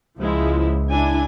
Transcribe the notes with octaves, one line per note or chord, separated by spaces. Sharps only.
C#2 F3 G#3 E4
D4 E4 G#5